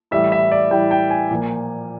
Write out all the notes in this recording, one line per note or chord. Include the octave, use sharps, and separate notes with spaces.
A2 E3 G3 E5
E5
D5
A2 E3 G3 G5
G5
G#5
A#2 F3 A#3